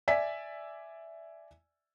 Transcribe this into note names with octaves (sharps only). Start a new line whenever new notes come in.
D5 E5 G#5 B6